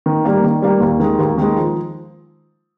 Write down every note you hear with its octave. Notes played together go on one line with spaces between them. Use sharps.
D#3
G3 A#3
D#3
G3 A#3
D#2
D#3 G#3
D#2
D#3 G#3
F3